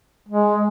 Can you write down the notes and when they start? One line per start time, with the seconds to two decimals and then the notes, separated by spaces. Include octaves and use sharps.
0.29 G#3